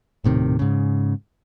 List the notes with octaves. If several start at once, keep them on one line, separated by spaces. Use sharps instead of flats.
D#1 A2 C3 D#3
G#2 C#3